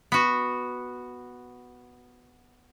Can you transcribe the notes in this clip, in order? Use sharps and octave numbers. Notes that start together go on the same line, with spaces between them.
B3 F#4